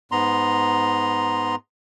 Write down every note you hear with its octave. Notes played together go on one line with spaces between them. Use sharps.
G#2 B3 A#5 C6